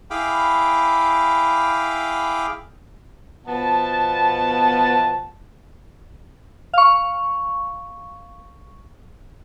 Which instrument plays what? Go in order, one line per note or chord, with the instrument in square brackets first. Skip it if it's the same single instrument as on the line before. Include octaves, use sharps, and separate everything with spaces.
[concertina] E4 G#4 F5 G5 B5 D6
[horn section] B2 F3 B3 A5
[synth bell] F5 C#6